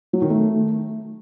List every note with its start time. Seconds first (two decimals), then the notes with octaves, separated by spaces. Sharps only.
0.13 F#3
0.22 D#3
0.30 A3